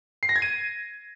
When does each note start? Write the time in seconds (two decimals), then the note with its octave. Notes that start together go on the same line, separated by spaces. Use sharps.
0.23 C7
0.29 A#6
0.36 G#6
0.42 D#7